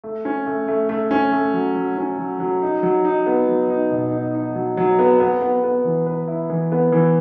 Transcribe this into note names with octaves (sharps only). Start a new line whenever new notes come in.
A3
C#4
A3
A3
A3
C#4
A3
F#3
F#3
C#4
F#3
F#3
D#4
F#3
D#4
B3
F#3
D#4
B2
D#4
D#4
F#3
F#3
B3
B3
B3
B3
E3
B4
E4
E3
B3
E3